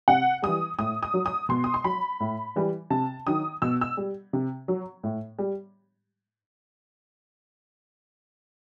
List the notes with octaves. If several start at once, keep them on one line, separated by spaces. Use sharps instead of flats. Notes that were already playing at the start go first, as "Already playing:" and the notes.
C3 F#5
E3 G3 D#6
A2 D#6
D#6
F#3
D#6
B2 C6
D#6
C6
F#3 B5
A2
E3 G3
C3 A5
D#3 F#3 D#6
B2 E6
E6
G3
C3
F#3
A2
G3